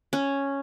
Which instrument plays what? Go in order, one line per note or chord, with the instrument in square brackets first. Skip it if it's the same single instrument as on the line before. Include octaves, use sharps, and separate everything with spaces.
[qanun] C#4